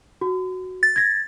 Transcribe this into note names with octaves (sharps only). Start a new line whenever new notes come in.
F#4
A6
G#6 A#6